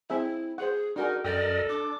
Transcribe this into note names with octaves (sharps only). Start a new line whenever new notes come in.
C4 E4 G#4 E5
G#4 C5 F#5
D4 D#4 F#4 G#4 A#4
F#2 A4 A#4 D5 D#5 G5
D4 D6